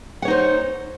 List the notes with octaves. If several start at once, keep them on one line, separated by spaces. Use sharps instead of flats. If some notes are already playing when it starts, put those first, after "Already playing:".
D#4 C5 C#5 F#5